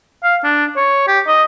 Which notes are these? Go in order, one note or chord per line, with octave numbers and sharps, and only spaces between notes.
F5
D4
C#5
G4
D#5